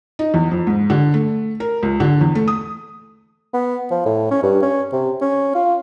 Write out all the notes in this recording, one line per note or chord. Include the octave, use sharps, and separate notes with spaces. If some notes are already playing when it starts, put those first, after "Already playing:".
D#4
E2
F2
G#2
D3
A3
A#4
C#2
D3
E2
A3
D#6
B3
F3
A2
C#4
G2
C#4
C3
C#4
F4